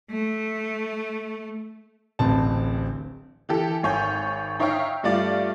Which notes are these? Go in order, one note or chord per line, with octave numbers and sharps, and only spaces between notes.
A3
D1 A1 C4 A5
E3 G4 A4
G#1 C#5 G#5 G6
D#4 C#5 E5 F5 G5 C#6
G2 A3 F4 D5 A6